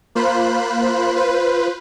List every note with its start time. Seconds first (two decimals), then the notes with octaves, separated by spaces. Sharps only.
0.15 A#3 F4 C5 B5 F#6
1.16 F4 B4 C5